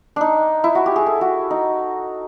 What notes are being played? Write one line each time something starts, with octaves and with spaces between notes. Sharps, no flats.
D4 D#4
E4
F#4
G4
G#4
A4
F#4
D#4